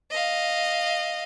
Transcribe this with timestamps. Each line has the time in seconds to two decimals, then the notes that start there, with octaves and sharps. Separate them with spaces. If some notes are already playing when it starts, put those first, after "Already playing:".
0.11 D#5 F5